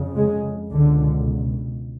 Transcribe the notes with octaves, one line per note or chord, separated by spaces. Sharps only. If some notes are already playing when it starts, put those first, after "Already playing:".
Already playing: F2 C#3
G#3
C#2 B2 D3